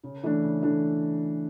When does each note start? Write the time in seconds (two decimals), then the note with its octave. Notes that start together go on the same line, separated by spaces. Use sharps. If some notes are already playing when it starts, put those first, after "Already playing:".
0.03 C#3
0.23 E3 A3 D4
0.43 C#3
0.62 E3 A3 D4